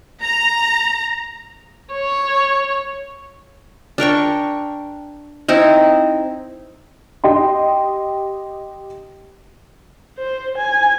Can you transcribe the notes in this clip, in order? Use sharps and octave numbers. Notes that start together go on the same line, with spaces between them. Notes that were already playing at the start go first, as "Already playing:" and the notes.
A#5
C#5
D4 A#4 G5 C#6
C4 D#4 E4
G4 D#5 G5 C6
C5
G#5